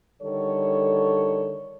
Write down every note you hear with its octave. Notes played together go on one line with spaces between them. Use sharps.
D3 D#3 G3 A4 C#5